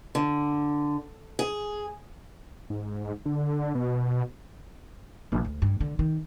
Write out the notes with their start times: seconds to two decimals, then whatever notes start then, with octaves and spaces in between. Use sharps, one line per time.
0.15 D3
1.39 G#4
2.70 G#2
3.26 D3
3.75 B2
5.32 A#1
5.45 D2
5.62 G2
5.80 D3
5.99 D#3